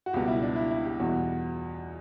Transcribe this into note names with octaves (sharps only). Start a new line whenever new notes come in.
F#4
C#2 B2 G3 G4
E4
D4
E4
E4
G4
E2 B2 G3 F#4